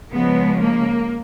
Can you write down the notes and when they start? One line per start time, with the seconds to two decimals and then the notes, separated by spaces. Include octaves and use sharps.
0.12 C#3 F3 G#3 B3
0.61 A#3